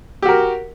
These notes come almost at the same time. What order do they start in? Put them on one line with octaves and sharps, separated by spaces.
G4 F#4 A#4